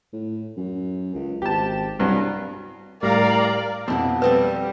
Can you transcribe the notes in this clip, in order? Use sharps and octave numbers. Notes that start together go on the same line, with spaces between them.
A2
F#2
C#2
G#1 G4 A5
C2 G2 B2 F#3
A2 G3 G4 A#4 D5 F5 A#5
F2 B2 C4 E4 F#5
F3 G3 C4 A4 B4